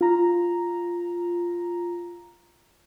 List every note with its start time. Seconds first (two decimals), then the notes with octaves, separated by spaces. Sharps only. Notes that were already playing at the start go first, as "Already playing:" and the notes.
0.01 F4 A#5